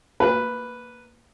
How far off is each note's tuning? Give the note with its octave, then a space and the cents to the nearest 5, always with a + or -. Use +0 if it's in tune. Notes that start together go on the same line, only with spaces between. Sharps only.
A#3 -10 B4 +0 E5 +40